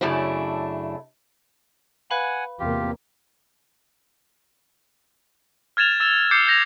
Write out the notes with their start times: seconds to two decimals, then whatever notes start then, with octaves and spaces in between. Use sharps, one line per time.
0.01 F#2 C#3 A3 D4 E4
2.11 B4 F5 F#5 G#5 B5
2.60 E2 C3 A#3 F4 G4
5.77 F6 G#6 A6 E7 F7
6.00 E6 A6 E7
6.31 D6 G6 C7 C#7
6.47 G6 A#6 F7